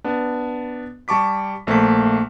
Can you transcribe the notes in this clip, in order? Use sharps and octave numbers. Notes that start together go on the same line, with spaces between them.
B3 D4
G3 A5 C#6 D6 B6
A#1 A3 A#3 C5 A5 B6